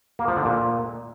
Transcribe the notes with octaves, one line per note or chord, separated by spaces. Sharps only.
A#3
F3
D3
A#2